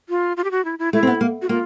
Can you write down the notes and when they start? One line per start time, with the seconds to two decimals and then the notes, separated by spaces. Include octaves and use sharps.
0.09 F4
0.37 F4
0.44 G4
0.51 F#4
0.65 E4
0.79 E4
0.93 A3 E4
1.03 C4
1.07 B3
1.21 A#3
1.42 F#4
1.49 A#3 F4